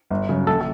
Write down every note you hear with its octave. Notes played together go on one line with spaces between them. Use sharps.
G1
F#2 C#3
A#1 A4